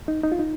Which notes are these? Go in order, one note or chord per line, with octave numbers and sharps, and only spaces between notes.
D#4
D#4
F4
D#4